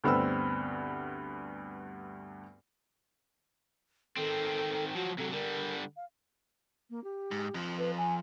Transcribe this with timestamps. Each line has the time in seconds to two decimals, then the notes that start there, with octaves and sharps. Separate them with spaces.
0.04 D2 G2 B3 C4 B5 E6
4.17 D#3 C4 A4
4.95 F3 F#3 F#4
5.18 C3 F#3 A4
5.32 D3 G3 A#4
5.96 F5
6.90 A#3
7.04 G4
7.31 G#2
7.54 F2 F3
7.78 B4
7.98 G#5